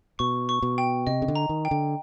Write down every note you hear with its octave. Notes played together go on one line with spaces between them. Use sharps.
B2 C#6
C#6
B2
G5
C3 D#5
C#3
D3
A#5
D#3
G5
D3